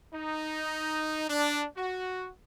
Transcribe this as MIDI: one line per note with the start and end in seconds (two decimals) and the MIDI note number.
0.14 1.26 63
1.28 1.64 62
1.77 2.29 66